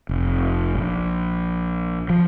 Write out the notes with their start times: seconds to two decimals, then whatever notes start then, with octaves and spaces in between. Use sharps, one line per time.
0.09 F1
0.75 A#1
2.10 F3